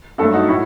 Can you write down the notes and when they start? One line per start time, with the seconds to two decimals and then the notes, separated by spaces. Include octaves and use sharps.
0.18 G2 F#3 A3 F#4 A4
0.33 D#4 F#4
0.48 A2 E4